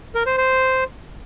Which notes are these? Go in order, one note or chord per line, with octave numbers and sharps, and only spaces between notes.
A#4
C5
C5